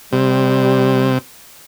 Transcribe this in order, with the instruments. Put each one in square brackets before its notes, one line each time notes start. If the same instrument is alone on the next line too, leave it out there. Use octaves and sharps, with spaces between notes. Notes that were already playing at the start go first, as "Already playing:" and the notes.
[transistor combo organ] C3 [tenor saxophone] G3